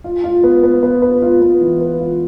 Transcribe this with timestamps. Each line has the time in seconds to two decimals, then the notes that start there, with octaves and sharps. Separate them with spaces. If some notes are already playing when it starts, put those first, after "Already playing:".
0.04 F4
0.24 F4
0.44 B3
0.63 B3
0.83 B3
1.02 B4
1.22 F4
1.42 B3
1.61 E3
1.80 B4
2.00 F4